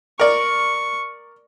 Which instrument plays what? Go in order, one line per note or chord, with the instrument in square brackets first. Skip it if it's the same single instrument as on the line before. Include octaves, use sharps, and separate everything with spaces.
[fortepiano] A#4 D5 [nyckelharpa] C#6